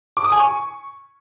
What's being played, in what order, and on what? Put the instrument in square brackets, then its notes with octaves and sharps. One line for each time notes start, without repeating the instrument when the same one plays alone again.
[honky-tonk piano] D6
D#6
G#5
C#6